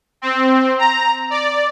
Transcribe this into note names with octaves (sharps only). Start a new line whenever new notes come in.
C4
A#5
D5